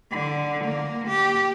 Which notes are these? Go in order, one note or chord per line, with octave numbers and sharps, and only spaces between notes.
D3
A#3
G4